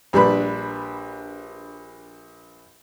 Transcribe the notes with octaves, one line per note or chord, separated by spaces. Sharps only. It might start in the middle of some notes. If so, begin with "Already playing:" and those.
A#1 G3 D4 B4 B5